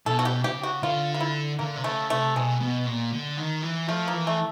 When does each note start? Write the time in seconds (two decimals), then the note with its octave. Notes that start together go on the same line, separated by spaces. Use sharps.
0.06 B2 A4
0.19 F#4
0.25 G4
0.44 C#3 G4
0.63 F#4
0.83 D3 F4
1.14 F4
1.20 E4
1.59 D3 A#3
1.77 C3
1.84 C#3 A3
2.10 C3 A3
2.35 B2 G#3
2.61 B2
2.86 A#2
3.12 D3
3.38 D#3
3.63 E3
3.88 F3 A3
4.08 A#3
4.14 E3
4.27 A3